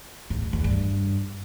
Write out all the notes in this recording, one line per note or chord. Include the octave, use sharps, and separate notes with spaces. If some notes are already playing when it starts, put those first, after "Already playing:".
G#2
F#2
E2
G2